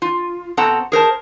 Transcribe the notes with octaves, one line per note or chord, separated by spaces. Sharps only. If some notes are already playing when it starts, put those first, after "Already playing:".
F4
B2 C4 A4 F#5 A5 A#5
G#4 A#4 C5 A5